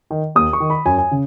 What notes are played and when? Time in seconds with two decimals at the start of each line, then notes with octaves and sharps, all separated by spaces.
0.11 D#3
0.35 D#2 D#6
0.53 C#6
0.60 D#3
0.70 B5
0.86 F#2 G#5
0.98 G#5
1.11 C#3